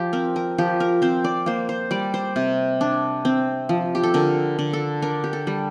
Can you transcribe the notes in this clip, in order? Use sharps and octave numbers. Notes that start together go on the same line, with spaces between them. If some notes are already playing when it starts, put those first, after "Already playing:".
Already playing: F3 F4 G4
C4 A#4
A#4
F3 G4
A#4
C4 C5
D5
A#3 C5
C5
G3 D5
C5
C3
D4
C4
F3
G4
A4
D3 A#4
D3
A4
D4 A#4
G4
A4
G3